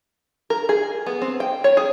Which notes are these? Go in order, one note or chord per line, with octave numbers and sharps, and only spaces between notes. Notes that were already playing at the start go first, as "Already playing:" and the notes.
A#4
G#4
B3
C4
G5
C#5
G#4